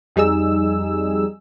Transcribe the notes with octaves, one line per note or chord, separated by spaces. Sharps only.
F2 G3 D#4 G#4 E6